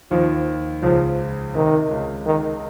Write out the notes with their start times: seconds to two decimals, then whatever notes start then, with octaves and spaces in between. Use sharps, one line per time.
0.11 D#2 D#3 F3
0.82 C#2 C#3 F3
1.54 C3 D#3
1.90 C#2 C#3
2.26 D#3